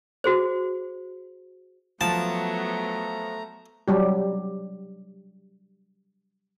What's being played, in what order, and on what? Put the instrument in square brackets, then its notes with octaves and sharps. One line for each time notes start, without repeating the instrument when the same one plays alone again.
[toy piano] F#4 G#4 C5
[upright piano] F3 [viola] F#3 B3 [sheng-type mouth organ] A3 A#5 [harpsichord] A5
[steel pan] F#3 G3 G4